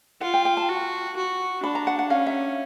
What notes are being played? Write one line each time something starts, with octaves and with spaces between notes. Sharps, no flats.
F4 F#5
G5
G5
A5
F#4
F#4
D4 B5
A#5
F#5
F#5
C#4 F5
E5